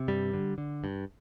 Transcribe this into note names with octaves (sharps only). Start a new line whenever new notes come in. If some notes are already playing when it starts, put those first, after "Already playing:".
Already playing: C3
G2 G3
D3
D3
G2